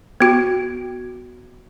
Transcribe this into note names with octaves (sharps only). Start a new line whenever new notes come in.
B3 F#4